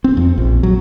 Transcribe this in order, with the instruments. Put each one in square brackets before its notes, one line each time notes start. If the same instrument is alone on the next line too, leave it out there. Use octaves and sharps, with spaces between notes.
[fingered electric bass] C4
F2
A#1
F#3